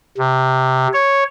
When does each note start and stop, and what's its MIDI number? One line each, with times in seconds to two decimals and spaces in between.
0.18 0.88 48
0.93 1.23 73